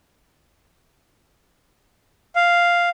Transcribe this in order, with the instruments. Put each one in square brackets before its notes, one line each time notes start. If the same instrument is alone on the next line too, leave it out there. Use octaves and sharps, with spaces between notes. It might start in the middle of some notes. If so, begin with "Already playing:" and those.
[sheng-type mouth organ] F5